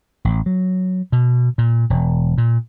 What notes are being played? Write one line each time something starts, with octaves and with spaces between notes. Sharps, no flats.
A1
F#3
B2
A#2
E1
A#2